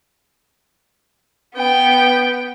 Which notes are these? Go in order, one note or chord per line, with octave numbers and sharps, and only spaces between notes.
B3 G5